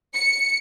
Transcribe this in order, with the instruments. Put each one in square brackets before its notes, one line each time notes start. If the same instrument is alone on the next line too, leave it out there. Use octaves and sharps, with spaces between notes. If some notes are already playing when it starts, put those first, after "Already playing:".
[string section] C#7